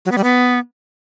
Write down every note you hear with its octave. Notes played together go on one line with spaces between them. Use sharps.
F#3
B3
G3
B3